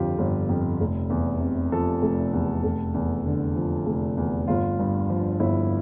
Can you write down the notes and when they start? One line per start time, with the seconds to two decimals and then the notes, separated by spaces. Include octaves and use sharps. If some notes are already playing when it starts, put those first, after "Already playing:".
Already playing: G1 F2 D3 F3 F4 G4
0.18 G1
0.49 F2
0.80 F1
1.10 E2
1.41 C3
1.72 F3 A4
2.02 F1
2.33 E2
2.63 F1
2.94 E2
3.25 D3
3.56 F3
3.86 F1
4.17 E2
4.47 G1 F4
4.79 G2
5.10 F3
5.40 G1 E4